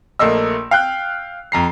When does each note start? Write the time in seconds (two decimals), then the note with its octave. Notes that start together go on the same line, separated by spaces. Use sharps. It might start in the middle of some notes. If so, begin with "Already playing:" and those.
0.19 A#1 A3 A#3 D#5 E6
0.71 F5 G5 F#6
1.52 F2 A#5 C7